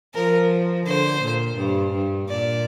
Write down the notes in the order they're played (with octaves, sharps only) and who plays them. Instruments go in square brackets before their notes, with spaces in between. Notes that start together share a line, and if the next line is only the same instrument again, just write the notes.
[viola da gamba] F3 [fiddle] A#4
[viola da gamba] D3 [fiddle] C5
[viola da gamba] A#2
G2
G2
[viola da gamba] A#2 [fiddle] D5